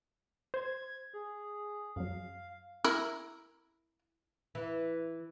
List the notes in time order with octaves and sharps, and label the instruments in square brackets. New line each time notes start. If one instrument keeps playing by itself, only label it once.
[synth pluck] C5 [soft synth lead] G#6
[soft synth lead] G#4
[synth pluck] F#2 F#3 [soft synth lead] F5
[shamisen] E4 A#4
[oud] E3